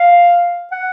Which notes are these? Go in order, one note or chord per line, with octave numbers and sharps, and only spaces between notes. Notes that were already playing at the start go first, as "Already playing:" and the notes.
Already playing: F5
F#5